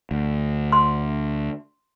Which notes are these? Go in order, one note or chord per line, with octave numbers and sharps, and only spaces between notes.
D2
C6